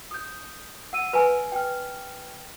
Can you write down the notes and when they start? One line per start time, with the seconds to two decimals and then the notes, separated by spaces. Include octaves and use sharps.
0.11 D#6 G6
0.93 F#5 E6 D#7
1.13 B4 G#5
1.52 G5 F6